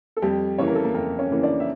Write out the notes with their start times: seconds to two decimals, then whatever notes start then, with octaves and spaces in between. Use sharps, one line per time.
0.17 A4
0.22 F2 G3 G4
0.59 C#3 E3 A#3 C#5
0.68 A#4
0.75 A4
0.84 A#3 A#4
0.95 F2 A#3 A#4
1.19 C#4 C#5
1.31 C#3 E3 A#3
1.43 D4 D5
1.60 E5